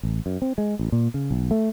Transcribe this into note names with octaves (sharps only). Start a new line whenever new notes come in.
A1
F#2
C4
G#3
A1
A#2
C#3
B1
A3